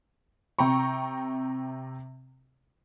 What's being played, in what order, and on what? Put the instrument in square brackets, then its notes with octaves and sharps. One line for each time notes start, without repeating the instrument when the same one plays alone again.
[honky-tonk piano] C3 G5 A#5 C#6